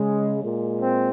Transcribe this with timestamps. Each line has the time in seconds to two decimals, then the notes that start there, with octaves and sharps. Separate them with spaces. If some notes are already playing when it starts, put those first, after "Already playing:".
Already playing: C#3 G#3
0.42 A#2 G#3
0.81 C4